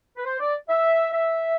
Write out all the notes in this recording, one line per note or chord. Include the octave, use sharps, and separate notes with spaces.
B4
C5
D5
E5
E5